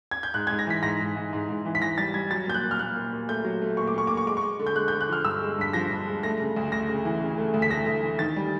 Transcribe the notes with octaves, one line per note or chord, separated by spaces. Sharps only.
G#6
G6
G#2 F#6
G#2 G#6
A#6
E3 B6
G#2 A#6
G#2
G#2
G#2
G#2
E3
B6
E3 A#6
G3 A6
G3 G#6
F#3 A6
A#2 G6
F#6
A#2
F6
A#2 F#6
A#2
A#2
A3 G6
F#3
A3
A#2 C#6
D6
A#2 C#6
A#2 D6
C#6
G#3 D6
C#6
G#3
D3
G6
G#3 F#6
G6
D3
F#6
F3 F6
G2 E6
G#3
G2 B6
F3 A#6
G2
G#3
A3 A#6
C#3
D2
D2 A#6
C#3
E3
C#3
A3
D2
B6
A3 A#6
D2
E3
D#3 A6
G3